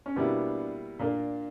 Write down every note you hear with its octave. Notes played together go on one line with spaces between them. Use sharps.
C#4
B2 G3 A#3 B3 D4 E4
A#2 A#3 D4 A#4